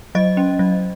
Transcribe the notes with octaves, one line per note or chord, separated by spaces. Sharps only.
F#3 D#5
C#4
F#3